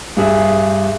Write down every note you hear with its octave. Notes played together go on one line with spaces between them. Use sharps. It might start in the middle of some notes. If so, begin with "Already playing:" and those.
G2 G#4 E5